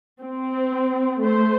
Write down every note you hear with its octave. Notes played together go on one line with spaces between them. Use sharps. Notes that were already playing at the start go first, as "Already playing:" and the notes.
C4
A3 C5